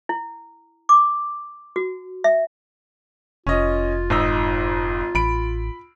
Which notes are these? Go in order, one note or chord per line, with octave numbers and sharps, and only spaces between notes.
E4
D6
F#4
E5
F1 C#4 F4 D#5
G#1 D#4 E6
A1 B5 D7